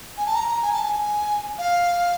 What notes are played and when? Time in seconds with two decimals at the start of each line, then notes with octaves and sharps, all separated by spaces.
0.18 G#5
0.26 A5
0.35 A#5
0.49 A#5
0.63 G#5
0.73 A5
0.84 G#5
1.58 F5